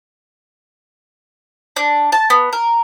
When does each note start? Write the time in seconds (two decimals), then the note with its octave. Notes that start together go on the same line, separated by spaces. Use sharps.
1.76 D4
2.12 A5
2.30 B3
2.53 A#4